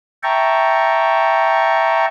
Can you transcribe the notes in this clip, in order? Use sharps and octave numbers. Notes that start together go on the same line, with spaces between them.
E5 G5 A5 A#5 C#6